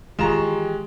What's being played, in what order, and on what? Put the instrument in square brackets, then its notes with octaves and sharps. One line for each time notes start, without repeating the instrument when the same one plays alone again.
[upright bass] D#3 E3 [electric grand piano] G#3 E7 [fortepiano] F4 A#5 C#6 [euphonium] G4